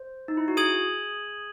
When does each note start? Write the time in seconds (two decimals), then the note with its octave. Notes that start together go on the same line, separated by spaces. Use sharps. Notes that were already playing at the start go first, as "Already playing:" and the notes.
Already playing: C5
0.28 D#4
0.37 E4
0.48 F#4
0.57 G#4 D#6 G#6 D#7 F#7